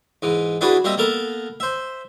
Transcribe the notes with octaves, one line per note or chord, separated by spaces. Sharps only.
G#2 E3
D4 E4 F#4 G#4 B4 D5
G3 A#3 C4 D#5 E5
A#3 B3 A4 A#4
C5 E5